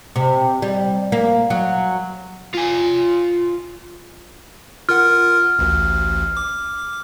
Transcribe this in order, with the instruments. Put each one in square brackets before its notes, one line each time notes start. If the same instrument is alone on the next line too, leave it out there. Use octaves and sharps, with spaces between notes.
[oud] C3
G3
A#3
F#3
[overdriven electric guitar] F4 G#5
[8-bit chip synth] F4 A#4 F#5 [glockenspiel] F6
[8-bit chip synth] A1 D2
D6